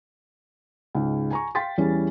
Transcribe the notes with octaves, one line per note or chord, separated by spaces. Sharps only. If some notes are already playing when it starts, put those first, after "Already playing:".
C#2 G#2
G#5 A#5 C#6
F5 G5 C6 A6 B6
E2 E3 G3 C#4 G#4